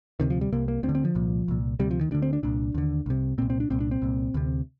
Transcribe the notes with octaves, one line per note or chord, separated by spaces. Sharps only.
D2 C3 D#3
F3
G3
C2 C3 A#3
A#3
D2 C4
D3
C4
F3
C2 A#2
C2 A#2
D2 C3 G3
F3
D#3
D2 D3 D4
C4
D4
C2 A#2 D4
D#2 D3
C2 C3
C2 A#2 C4
C4
D4
C2 A#2 C4
D4
C4
C2 A#2
D2 C3